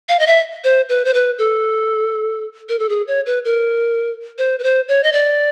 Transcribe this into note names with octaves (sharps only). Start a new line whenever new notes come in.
F5
D#5
E5
C5
B4
C5
B4
A4
A#4
A4
G#4
C#5
B4
A#4
C5
B4
C5
C#5
D#5
D5